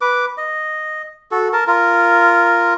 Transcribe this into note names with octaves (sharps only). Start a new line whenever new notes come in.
B4 D6
D#5
F#4 A4
A#4 A5
F4 A#4